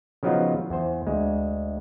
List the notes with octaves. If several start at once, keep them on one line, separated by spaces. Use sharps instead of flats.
C#3 F3 F#3 B3 D#4 F4
E2 C5
D2 G#3